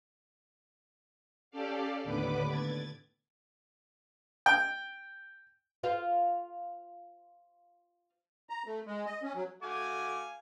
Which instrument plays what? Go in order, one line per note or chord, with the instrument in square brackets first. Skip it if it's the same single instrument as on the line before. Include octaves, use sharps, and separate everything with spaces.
[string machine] C#4 G4 A4 D5 F5
D#2 A2 D3 B3 B4 D6
G#6 A6
[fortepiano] G5
[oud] F4 C5 F5
[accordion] A#5
A3
G#3
D#5
C#4
F#3
[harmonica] A3 F#4 D6 [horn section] F5 G#5